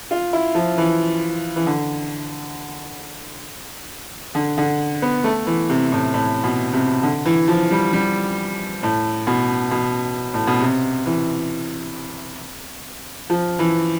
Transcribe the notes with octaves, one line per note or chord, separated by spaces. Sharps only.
F4
E4
F3
E3
E3
D3
D3
D3
B3
A3
E3
C3
A2
A2
B2
C3
D3
E3
F3
G3
G3
A2
B2
B2
A2
B2
C3
E3
F3
E3